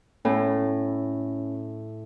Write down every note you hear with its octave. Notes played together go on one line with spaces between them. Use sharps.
A2 C#4